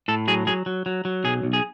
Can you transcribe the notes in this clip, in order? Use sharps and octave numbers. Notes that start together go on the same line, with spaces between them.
A2 A4
F#3 G#4
F#3 G#4
F#3
F#3
F#3
B1 G#4
B1
G#4